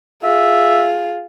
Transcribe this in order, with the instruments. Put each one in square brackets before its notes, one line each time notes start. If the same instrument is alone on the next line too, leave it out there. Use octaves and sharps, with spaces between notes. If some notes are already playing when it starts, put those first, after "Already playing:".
[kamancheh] F4 G#4 [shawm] E5